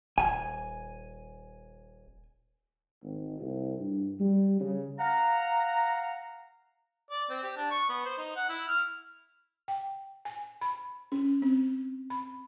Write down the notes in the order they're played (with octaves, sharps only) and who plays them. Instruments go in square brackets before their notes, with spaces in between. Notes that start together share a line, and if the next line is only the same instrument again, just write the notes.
[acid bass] D#1 [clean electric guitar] G#5
[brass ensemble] G#1
C2
G2
G3
C#3
[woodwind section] F5 F#5 A#5
[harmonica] D5
C4
G4
D4
C#6
B3
C5
D#4
F#5
E4
F6
[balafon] G5
G#5
B5
C#4
C4
B5